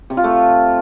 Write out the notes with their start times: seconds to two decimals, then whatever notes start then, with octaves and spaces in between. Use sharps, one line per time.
0.10 C3
0.17 F4
0.24 A3